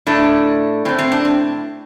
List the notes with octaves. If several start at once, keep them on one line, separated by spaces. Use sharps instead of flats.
A2 A3 D4
A2 A3 C4
C4
D4
C4